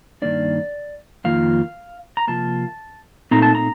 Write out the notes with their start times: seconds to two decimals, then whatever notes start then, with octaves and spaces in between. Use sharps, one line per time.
0.22 G2 D#3 G3 A#3 D4 D5
1.24 F2 D#3 A#3 F4 F5
2.17 A#5
2.27 C3 F3 A#3 F4 A5
3.31 A#2 A3 C4 D#4 A#5
3.42 A5
3.55 A#5